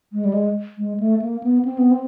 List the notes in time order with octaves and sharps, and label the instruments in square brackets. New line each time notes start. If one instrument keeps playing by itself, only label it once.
[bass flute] G#3
G3
G#3
G#3
A3
A#3
B3
C4
B3
C4